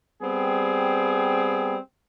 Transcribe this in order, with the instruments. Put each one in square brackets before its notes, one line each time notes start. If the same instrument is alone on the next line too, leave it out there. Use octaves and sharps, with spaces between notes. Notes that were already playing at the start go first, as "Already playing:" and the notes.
[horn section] G3 B3 C4 G#4